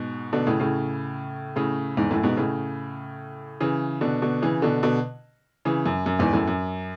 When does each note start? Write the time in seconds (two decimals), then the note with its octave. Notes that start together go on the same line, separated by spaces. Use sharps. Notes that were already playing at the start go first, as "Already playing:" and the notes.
Already playing: G#2 B2
0.33 B2 D3
0.47 A2 C#3
0.60 A2 C#3
1.56 A2 C#3
1.97 E2 G#2
2.10 F#2 A2
2.23 G#2 B2
2.37 A2 C#3
3.60 C#3 E3
4.01 B2 D3
4.22 B2 D3
4.42 C#3 E3
4.62 B2 D3
4.83 B2 D3
5.65 C#3 E3
5.86 F#2
6.06 F#2
6.19 E2 G#2
6.33 F#2 A2
6.48 F#2